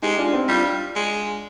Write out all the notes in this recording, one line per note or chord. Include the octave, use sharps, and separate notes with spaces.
G#3 D#4 G4
D4 F4
C4 D#4
G3 D4 F4
G#3